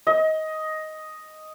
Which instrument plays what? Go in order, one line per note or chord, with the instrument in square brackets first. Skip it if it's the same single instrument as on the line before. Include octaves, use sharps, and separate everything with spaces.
[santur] D#5